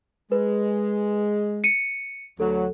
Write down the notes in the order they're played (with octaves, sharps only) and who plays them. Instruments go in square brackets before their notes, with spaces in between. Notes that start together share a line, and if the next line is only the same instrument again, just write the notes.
[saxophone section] G#3 [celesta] B4
[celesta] C#7 D#7
[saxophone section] D2 F#3 [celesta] A4